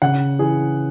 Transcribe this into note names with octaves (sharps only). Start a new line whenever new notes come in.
C#3 F#5
E3 G#4